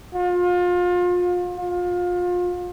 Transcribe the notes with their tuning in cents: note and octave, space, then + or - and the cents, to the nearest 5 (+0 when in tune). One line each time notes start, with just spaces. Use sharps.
F4 +30
F4 +30